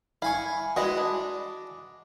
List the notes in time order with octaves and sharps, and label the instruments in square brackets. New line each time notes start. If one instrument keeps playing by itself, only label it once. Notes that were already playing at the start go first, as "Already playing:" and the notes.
[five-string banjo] E4 [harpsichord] F5 G#5 C#6
[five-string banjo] E3 G#3 E4 [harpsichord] F#4 D#5
[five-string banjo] D4